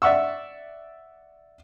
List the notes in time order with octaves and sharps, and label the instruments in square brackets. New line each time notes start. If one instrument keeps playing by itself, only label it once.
[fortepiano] D5 E5 F#5 C#6 E6